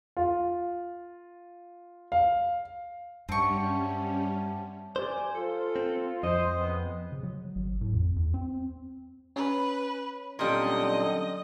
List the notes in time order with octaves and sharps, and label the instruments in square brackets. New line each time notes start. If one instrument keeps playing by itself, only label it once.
[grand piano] F4
F5
[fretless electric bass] G2 [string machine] G3 C#4 [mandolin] C4 C#6 [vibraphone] E5 F#5 A5
[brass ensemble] F#2 D5 G#5 [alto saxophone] G4 [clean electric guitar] C5
[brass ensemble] F4 [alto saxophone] A4
[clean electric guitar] C4
[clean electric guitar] F2 [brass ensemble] C5 [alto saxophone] D#5
[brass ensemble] C#3 G#3 B3
[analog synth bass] C#3
F#3
G#1
A2
F2
E2
C4
[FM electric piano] C#4 [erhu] B4
[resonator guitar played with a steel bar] A#2 G3 [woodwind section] D3 F#3 C4 [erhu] D#5